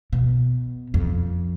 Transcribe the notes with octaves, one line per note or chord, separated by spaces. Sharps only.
B2
F2